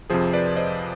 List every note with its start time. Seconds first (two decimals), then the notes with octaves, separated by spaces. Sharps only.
0.10 F2 C3 F3 G#4 C5
0.33 B4 D5
0.56 C5 D#5